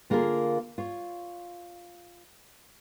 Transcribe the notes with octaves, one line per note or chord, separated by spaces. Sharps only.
D3 A#3 F4 G#4 A#4
F4 C#5